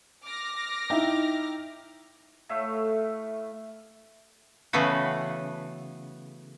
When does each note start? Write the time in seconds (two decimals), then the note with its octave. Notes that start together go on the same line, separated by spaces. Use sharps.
0.24 D6 F6 A#6
0.90 D#4 E4 E5 G5
2.49 A2 A3 E5 F5
4.73 C#3 E3 A3 B3 F#4